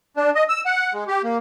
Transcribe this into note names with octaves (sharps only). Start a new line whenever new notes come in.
D4
D#5
E6
F#5
G#3
G4
A#3